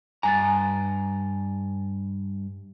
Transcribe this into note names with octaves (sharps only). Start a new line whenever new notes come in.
G2 G#5 A#5 A6